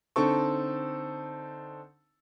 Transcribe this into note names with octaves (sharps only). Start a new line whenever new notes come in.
D3 C4 D#4 A4 A5 C#6